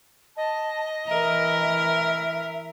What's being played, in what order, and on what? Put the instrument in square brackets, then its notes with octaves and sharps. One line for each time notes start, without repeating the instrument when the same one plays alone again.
[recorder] D#5 [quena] A5
[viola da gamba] E3 A#4 [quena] E5